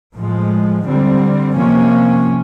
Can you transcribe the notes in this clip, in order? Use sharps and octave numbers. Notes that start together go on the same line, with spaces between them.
A2 F3 G#3
D3 G3 C4
C3 F3 A#3 C#4